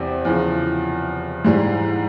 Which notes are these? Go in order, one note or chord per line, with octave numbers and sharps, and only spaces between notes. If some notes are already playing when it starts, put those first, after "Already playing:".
Already playing: E2 C3 G3 C4
E2 C#3 F3
G#2 E3 G3